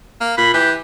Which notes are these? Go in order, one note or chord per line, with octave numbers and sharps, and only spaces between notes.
A#3
A#2 B5
E3 G4